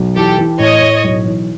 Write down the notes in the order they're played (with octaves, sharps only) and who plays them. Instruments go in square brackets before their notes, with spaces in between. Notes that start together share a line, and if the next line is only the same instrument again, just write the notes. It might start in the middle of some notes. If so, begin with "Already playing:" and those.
Already playing: [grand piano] B1
[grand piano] E3 [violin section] G4 A4
[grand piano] E3
[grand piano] A2 [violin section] C#5 D#5
[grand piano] A2
B1
E3